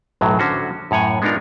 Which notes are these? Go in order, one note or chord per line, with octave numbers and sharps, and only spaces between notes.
B1 F#2 A2 F#3
D3 C#4 F#4 C5
F#2 A2 C#5 F#5 G#5
G#3 B3 D4 D#4 F4 A#4